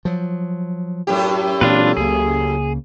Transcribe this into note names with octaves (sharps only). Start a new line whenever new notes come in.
F3 F#3
F#2 A2 G4
A#2 E3 C4 D4 F4 B4
C#2 C#3 A#3 G#4